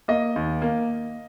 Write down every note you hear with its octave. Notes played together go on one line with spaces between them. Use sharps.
A#3 D#5
D#2
A#3